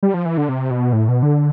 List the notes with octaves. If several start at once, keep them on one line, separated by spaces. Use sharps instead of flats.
G3
F3
E3
D3
C3
B2
A2
B2
D3